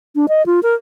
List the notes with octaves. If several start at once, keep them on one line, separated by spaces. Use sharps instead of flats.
D4
D#5
F4
A#4